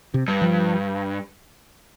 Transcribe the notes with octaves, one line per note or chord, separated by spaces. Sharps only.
C3
G2
F3